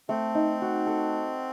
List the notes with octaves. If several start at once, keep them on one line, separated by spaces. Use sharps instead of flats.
A3 C4
D#4
F#4
A4